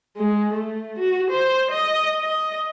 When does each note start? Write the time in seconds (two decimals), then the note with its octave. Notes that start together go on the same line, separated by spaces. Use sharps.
0.17 G#3
0.53 A3
0.98 F#4
1.30 C5
1.71 D#5
2.21 D#5